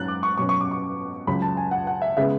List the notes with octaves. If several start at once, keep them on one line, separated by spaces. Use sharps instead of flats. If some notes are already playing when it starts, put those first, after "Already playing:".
Already playing: G#2 F#3 C#4 F#6 A6
D6
C#6
B2 F#3 C#4 C#6
C#6
D6
C#6
C#2 C#3 F#3 B5
A5
G#5
F#5
F#5
E5
C#3 G#3 B3 E5